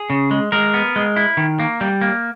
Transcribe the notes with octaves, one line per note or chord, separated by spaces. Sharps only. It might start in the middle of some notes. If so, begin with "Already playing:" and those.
Already playing: G#4
C#3
G#3
G#3 A#4
B3
G#3
E4
D#3
A#3
G3
A#3